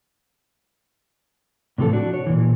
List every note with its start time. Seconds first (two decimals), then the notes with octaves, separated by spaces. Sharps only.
1.78 A2 C3 E3 F3 A4
1.93 D4 F#4
2.14 C#5
2.27 A#2 E3